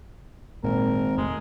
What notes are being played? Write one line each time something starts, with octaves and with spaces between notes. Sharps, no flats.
G#1 A#2 A#4
F1 G#3 A3